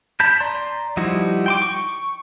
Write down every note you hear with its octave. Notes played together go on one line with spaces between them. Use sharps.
A5 B5 G6
D5 A#5 C6
F3 G3 D#4 E4 F#4
G5 C6 D6
C#6